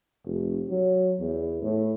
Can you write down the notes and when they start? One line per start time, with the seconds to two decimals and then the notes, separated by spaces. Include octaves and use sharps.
0.25 F1
0.70 F#3
1.20 E2
1.62 A2